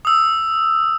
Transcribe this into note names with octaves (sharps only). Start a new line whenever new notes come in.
D#6 E6